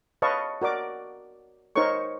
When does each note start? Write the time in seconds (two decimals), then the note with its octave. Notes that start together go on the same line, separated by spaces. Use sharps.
0.22 B4 C#5 D#5 F5 A5 C#6
0.62 F#4 A#4 D5 D6
1.76 D#4 A#4 C5 C#5 C#6